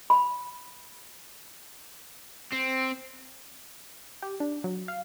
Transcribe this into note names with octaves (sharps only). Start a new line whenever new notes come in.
B5
C4
G4
D4
F#3
F5